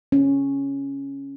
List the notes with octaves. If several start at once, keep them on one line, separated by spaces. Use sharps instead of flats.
C#4